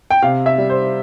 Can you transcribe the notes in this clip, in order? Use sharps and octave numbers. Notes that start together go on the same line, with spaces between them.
G5
C3 F5
E5
G3
C5